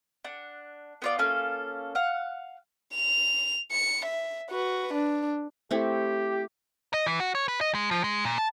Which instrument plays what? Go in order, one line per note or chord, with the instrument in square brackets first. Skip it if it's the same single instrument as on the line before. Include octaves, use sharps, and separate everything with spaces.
[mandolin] D4 F#5
B3 F4 D5
A#3 C#4 F4 A4
F5 F#5
[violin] F7
C#7
E5
F#4 B4
D4
[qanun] A3 C4 E4 [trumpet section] G4
[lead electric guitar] D#5
E3
F#4
C#5
B4
D#5
G#3
F3
G#3
A#2
A5